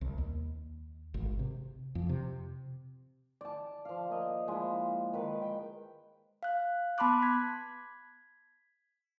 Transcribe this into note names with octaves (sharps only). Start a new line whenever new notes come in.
C2
D#2
G#1
C3
F2
C3
D5 A5
F3 F5
A#3 D#5
F3 G#3 E4
D#3 B4
G5
F5 F#6
B3 A5 B5 C6 D6 F#6
G#6 B6